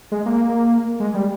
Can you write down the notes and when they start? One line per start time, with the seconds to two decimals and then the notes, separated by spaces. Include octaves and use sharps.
0.12 G#3
0.26 A#3
1.00 G#3
1.14 G3